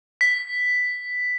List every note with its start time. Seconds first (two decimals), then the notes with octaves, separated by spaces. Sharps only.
0.21 B6